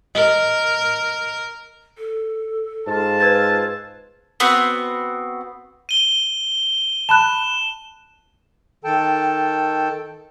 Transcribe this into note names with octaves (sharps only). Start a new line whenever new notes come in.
A#4 D#5
A4
G#2 F4 A5
B4 E6 G#6 A6
B3 C4 F#4
D#7 G7
A5 B5 F#6 E7
D#3 A4 G5 A5